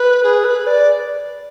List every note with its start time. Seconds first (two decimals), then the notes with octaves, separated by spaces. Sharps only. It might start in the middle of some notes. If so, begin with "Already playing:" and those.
Already playing: B4
0.23 G#4
0.44 B4
0.67 D5